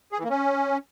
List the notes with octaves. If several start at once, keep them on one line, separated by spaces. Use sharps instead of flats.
G#4
E3
A#3
C#4